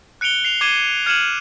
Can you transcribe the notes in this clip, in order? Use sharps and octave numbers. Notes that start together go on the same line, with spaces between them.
F#6 C#7 D7 F7 G7
C7 F7
D6 G#6 C7 D#7 E7 G7
F6 G#6 C#7 D#7 E7 F#7